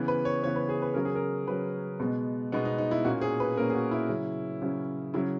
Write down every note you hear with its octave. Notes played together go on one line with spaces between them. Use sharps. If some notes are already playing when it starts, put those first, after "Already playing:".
Already playing: C#3 E3 B3
B4
C#5
C#3 E3 B3 C#5
B4
G#4
B4
C#3 F#3 C#4 A#4
G#4
A#4
C#3 F#3 C#4 B4
B2 G#3 B3
B2 G#3 B3 D#4
D#4
D#4
E4
A#2 A#3 C#4 F#4
G#4
B4
A#2 A#3 C#4 A#4
G#4
F#4
E4
C#3 F#3 C#4
C#3 F#3 C#4
C#3 F#3 C#4 E4